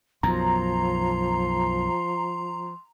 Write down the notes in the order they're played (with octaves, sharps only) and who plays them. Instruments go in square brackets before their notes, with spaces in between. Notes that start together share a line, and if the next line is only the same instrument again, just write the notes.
[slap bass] B1 F#2 [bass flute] F3 [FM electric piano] A#5 [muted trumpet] C6